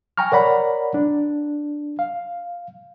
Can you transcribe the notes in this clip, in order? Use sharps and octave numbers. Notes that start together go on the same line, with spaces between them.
G5 G#5 A#5 C#6 F6
A#4 C#5 D5 F#5 A#5 B5
D4
F5